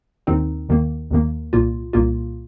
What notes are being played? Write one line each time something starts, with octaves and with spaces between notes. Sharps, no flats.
D#2 D#3 C4 D#4
D#2 D#3 A#3
D#2 D#3 A#3
C2 A#2 A#3 F4
C2 A#2 A#3 F4